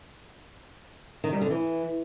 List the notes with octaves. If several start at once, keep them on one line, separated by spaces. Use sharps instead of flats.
D#3
G3
D3
E3